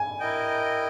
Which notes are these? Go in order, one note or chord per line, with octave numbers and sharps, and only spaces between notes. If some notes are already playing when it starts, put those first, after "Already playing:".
Already playing: G#5
E4 A#4 D#5 G5